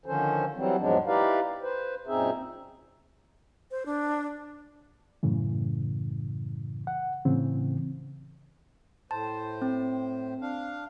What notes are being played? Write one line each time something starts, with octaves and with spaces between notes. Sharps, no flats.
D3 D#3 F3 C#4 A4 C5
E3 F#3 G3 C4
E2 G#2 F3 F#3 G#3 D4
D#4 E4 G4 B4 D5 F5
B4 C5
F#2 A#2 C4 D#4 G#4 E5
C5
D4
F#2 A2 C#3 E3
F#5
A2 C#3 E3 C4
A2 C5 A5
C4
D4 F5